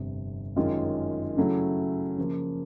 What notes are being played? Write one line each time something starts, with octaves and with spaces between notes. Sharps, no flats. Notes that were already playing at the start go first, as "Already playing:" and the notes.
Already playing: G1 F2 C3
F#2 D#3 G#3 C#4 F4
C#3 F#3 A3 C#4 E4
C#3 F3 A#3